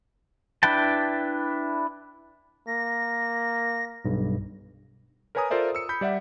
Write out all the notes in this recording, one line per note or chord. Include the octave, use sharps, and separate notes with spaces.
D4 E4 B4 G5 A5
A#3 A#6
B1 G2
A#4 B4 C#5 G#5 A#5 D#6
F4 A4 A#4 C5 D5 E5
E6 C#7
B5 G6 B6
G3 D5 E5 F#5